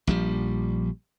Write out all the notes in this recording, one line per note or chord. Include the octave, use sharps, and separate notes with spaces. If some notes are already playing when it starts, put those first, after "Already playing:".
A#1 F3 G3